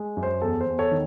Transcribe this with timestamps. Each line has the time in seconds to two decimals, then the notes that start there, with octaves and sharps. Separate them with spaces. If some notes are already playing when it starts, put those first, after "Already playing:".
Already playing: G#3
0.17 F#2
0.23 C5
0.42 E2 A4
0.61 C5
0.67 E2
0.79 A4 C#5
0.91 D#3